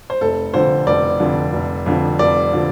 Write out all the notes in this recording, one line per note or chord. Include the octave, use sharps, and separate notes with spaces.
C5
F1 A4
F2 D3 F3 C5
F1 D5
F2 D3 F3
F1
F2 D3 F3
F1 D5
D3 F3